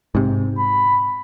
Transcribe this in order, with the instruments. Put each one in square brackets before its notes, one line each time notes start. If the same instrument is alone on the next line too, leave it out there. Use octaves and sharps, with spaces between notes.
[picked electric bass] G#2 C3
[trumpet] B5